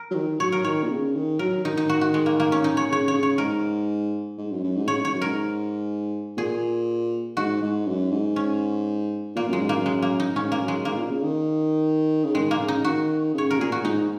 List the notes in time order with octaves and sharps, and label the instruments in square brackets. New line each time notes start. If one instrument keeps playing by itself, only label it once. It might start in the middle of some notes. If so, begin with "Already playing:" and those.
Already playing: [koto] A#4
[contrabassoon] F#3
D#3
[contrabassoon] F#3 [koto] C#5
[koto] A#4
[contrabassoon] D#3 [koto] C#5
[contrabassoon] A#2
C#3
D#3
[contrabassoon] F#3 [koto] A#4
[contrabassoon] D#3 [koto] D#4
[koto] D#4
F#4
F#4
G#3
A#3
A#3
C#4
D#4
C#5
[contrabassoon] C#3 [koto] C#5
[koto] C#5
[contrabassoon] C#3
[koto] C#5
[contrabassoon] G#2 [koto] A#4
[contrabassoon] G#2
F#2
F#2
G#2
[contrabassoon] C#3 [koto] C#5
[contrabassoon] G#2 [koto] C#5
[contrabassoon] F#2
[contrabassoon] G#2 [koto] A#4
[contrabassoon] A#2 [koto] G#4
[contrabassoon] G#2 [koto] F#4
[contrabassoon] G#2
F#2
G#2
[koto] C#4
[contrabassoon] A#2 [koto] A#3
[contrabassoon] F#2 [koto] G#3
[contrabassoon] G#2
[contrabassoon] F#2 [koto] A#3
[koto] G#3
A#3
D#4
[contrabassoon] G#2 [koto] C#4
[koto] A#3
[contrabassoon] F#2
[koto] G#3
[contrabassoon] G#2 [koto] A#3
[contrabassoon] A#2
C#3
D#3
C#3
[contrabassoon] D#3 [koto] G#3
[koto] A#3
[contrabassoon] C#3
[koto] D#4
[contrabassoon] D#3 [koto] F#4
[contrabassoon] C#3 [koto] C#5
[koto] A#4
[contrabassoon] A#2 [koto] G#4
[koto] F#4
[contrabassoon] G#2 [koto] D#4